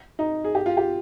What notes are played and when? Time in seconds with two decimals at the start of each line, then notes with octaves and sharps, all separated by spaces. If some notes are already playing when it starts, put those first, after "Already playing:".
0.19 D#4
0.44 G#4
0.55 G4
0.66 F4
0.77 G4